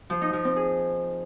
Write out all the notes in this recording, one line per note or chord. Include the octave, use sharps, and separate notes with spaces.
F3
D#4
F3
C4
G#4